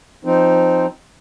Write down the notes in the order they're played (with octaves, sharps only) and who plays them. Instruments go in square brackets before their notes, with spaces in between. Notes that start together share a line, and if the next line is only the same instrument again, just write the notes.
[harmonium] F3 C4 D#4